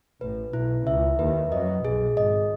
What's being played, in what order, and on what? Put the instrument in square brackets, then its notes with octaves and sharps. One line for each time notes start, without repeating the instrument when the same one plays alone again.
[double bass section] A1 A2 [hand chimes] B4
[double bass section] B1 B2 [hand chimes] E4
[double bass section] C#2 C#3 [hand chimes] E5
[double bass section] D#2 D#3 [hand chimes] B4
[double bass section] F#2 F#3 [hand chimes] D#5
[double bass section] B1 B2 [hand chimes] G#4
[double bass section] G#1 G#2 [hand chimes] D#5